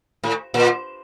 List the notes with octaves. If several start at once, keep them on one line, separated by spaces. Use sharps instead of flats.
A2
A#2